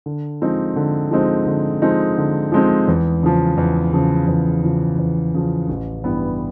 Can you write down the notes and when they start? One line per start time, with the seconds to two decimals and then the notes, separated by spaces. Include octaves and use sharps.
0.06 D3
0.42 F3 G#3 C4 D#4
0.76 D3
1.11 F3 G#3 C4 D#4
1.46 D3
1.82 F3 G#3 C4 D#4
2.18 D3
2.52 F3 G#3 C4 D#4
2.88 E2
3.23 C#3 F3
3.58 E2
3.93 C#3 F3
4.28 E2
4.63 C#3 F3
4.99 E2
5.34 C#3 F3
5.69 A1
6.04 G2 E3 G3 B3